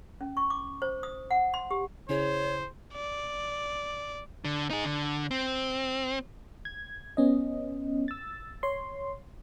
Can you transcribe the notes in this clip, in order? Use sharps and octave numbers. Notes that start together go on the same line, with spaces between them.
C#4
C#6
D6
C5
D#6
F#5
C6
G4
C#3 E4 G#4 C5 C#5
D5
D3
D#4 G#4
D3
C4
G#6
B3 C#4 D#5
E6 A6
C#5 C6